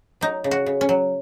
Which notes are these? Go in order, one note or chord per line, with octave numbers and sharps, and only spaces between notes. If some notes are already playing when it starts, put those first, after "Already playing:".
F#3 D#4
C#3
F#4
C#3
C#4
F#3